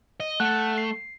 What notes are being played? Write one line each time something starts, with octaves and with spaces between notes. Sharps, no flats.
D#5
A3 F#5 F#6
C7